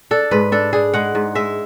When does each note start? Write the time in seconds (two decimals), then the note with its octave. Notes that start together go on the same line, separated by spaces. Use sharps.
0.11 D4 A4
0.31 G#2 B4
0.52 D4 A4
0.73 D4 G#4
0.94 G#3 F#5
1.15 G#2
1.35 G#3 E5